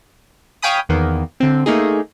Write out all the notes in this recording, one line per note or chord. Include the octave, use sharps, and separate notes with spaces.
C#5 F5 G5 G#5 B5 D#6
E2 D#3 A#3 B3
D3 C4
A3 A#3 D#4 G#4